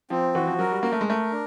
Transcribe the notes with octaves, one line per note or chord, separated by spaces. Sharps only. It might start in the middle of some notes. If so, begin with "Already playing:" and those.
F3 C4
E3 F#4
F3
F#3 A#4
G3
A#3 A#4
A3
G#3
A3 A#4
D4